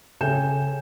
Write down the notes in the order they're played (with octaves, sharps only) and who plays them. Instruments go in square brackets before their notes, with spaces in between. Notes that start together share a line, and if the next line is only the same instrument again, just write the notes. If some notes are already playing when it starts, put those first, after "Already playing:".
[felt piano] C#3 A4 G5 G#5 G6 E7